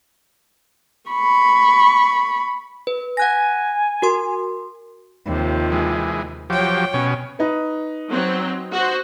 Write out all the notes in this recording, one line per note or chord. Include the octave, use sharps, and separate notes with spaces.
B5 C#6
B4
F#5 G#5 F#6 A#6
F#4 A#4 C6
D#2 C3 F3
E3 G#3
F3 F#3 G4 C#5 G5
B2 C#4
D#4 B4
F#3 C4
F#4 C5